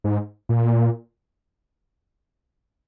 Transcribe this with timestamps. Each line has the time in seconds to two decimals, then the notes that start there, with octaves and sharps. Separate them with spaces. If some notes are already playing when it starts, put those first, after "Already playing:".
0.04 G#2
0.49 A#2